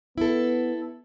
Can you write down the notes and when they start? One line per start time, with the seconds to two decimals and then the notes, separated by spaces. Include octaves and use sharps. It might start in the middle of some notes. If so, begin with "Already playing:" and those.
0.18 B3 E4 A4